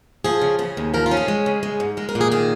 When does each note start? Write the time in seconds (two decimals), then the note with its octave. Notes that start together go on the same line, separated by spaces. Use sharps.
0.24 F3 G#4
0.42 C#3
0.59 C#3 G#4
0.77 D#2
0.94 F3 A#4
1.06 F4
1.11 C#4
1.17 G#4
1.28 G#3
1.46 C#3
1.63 G#3
1.80 G#2
1.97 G#3 A#4
2.09 A#4
2.15 A#2
2.21 G#4
2.31 D#3 G#4